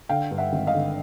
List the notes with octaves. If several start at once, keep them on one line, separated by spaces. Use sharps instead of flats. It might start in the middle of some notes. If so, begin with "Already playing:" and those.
D3 F5 G5
G2
E5 F#5
G#1
D#5 F5
D3